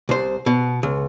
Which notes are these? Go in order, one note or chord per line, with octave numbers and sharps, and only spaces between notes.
C2 C5
B2
C#2